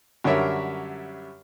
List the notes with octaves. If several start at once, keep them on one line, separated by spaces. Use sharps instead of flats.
F#2 D3 G3 A#4 C#5 E5